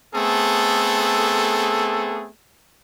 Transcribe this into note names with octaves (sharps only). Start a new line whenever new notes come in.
A3 B3 C4 G#4 A4